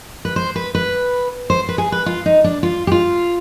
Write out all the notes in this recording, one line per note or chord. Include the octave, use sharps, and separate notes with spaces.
B4
C5
B4
B4
C5
B4
G#4
B4
F4
D#4
D4
F4
G4
F4